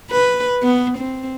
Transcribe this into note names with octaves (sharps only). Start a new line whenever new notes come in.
B4
B3
C4